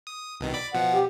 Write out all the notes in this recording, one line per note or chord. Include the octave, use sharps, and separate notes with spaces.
D#6
C2 B2 D#3
D5 B5 D6
B2 F3 F#5
G4